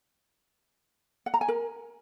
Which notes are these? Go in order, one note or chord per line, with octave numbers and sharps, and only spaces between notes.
F#5
A#5
G#5
A#4